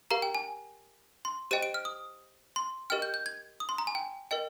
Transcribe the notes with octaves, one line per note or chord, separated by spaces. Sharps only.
G4 A#4 F5 A#5
G5
G#5
C6
G4 C5 D#5 G5 D#7
D7
F6
D#6
C6
G4 A#4 D#5 G5 F6
G6
G6
G#6
D#6
C6
A#5
G#5
G5
A#4 D#5 G5